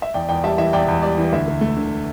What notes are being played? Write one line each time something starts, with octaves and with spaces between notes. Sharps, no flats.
E5
E2 D5 G5
E2 D5 G5
G3 E5 A5
E3 E5
E2 D5 G5
E2
G3 D5
E3
D2 E5
D2
A3
D3